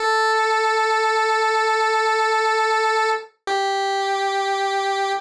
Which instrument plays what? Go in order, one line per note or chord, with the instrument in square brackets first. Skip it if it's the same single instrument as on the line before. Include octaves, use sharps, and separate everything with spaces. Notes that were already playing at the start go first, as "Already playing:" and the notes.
Already playing: [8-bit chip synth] A4
G4